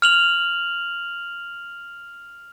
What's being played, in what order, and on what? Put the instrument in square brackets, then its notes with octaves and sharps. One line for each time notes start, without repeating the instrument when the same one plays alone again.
[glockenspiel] F6 F7 F#7